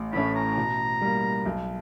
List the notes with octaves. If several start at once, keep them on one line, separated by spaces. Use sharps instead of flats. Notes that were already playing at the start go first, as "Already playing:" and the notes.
Already playing: A1
A2 E3 A3 C#4 B5
A#5
B2
G3 A#3
B1